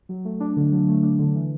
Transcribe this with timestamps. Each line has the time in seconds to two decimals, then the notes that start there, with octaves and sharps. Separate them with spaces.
0.09 F#3
0.25 A3
0.40 D4
0.57 D3
0.72 F#3
0.88 A3
1.03 D4
1.19 D3
1.35 E3